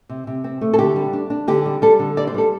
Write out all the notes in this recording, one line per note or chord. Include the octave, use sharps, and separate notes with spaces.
C3
C3
C4
A3
A4
D3 G4
G3
D4
D4
D3 G4
G3
G3 A4
D3
G3 D5
C5
G3 A4